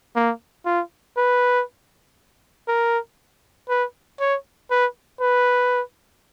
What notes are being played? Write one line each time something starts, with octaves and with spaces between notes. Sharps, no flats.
A#3
F4
B4
A#4
B4
C#5
B4
B4